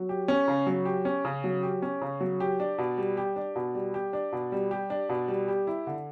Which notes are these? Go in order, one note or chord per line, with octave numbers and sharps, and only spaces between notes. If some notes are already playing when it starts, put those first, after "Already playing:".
Already playing: F#3
G4
C#4
C#3
F#3
G4
C#4
C#3
F#3
G4
C#4
C#3
F#3
G4
D4
B2
G3
G4
D4
B2
G3
G4
D4
B2
G3
G4
D4
B2
G3
G4
E4
D3